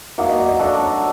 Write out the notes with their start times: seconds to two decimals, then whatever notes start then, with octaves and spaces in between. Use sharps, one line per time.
0.18 F#3 A#3 D#4 E5
0.28 D#5
0.39 D5
0.49 D#5
0.59 D4 F#4 A4 D5
0.80 C#5